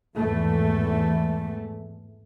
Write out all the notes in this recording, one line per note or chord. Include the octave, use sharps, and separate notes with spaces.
G#1 E2 A2 E3 A3